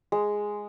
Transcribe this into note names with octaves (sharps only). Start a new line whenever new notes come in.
G#3